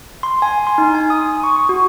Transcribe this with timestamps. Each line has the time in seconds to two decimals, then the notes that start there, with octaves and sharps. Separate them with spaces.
0.23 C6
0.42 G#5
0.67 C6
0.78 D#4
0.95 G#5
1.10 D#6
1.43 C#6
1.56 C#6
1.69 F#4